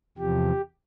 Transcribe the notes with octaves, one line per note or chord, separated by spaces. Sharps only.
E2 C3 F3 G4